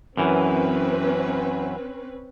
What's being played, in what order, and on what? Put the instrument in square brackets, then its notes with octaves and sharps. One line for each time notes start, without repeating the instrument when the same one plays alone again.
[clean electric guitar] F#2 E3 [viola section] C4 C#4 B4